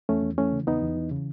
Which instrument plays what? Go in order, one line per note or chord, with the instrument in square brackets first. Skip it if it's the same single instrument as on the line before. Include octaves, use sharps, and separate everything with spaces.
[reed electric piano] E2 A3 C#4
E2
E3 A3 C#4
C#3
E2 B3 D#4
E2
E3
C#3